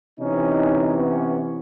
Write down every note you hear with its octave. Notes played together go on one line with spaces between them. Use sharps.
C3 E3 C#4 D#4
B3 C#4